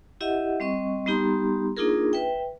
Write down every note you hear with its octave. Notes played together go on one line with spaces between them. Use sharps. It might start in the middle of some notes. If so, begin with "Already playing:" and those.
E4 G4 D#5 E5 F#5
G3 C4 D#5 C#6
G3 B3 D#4 G4 A#5 C6
A#3 D4 D#4 F4 G#4 A#4
B4 E5 G5